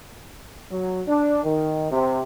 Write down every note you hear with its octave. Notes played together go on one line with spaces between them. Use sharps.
F#3
D4
D#3
C3